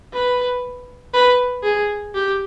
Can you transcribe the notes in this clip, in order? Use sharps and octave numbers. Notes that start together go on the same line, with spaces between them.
B4
B4
G#4
G4